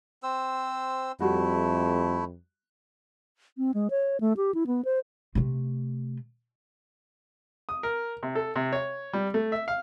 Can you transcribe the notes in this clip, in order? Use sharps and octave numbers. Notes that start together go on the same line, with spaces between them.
C4 C5 E6
F2 G3 A3 E4 F#4
C4
G#3
C#5
A3
G4
E4
B3
C5
C3 A3
D#6
A#4
C3
A4
C3
C#5
G3
A3
E5
F5